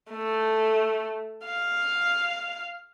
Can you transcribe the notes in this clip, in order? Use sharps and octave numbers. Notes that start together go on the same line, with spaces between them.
A3
F5